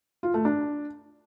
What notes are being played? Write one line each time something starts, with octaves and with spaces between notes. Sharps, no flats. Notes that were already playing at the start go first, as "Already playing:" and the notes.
F4
A3
D4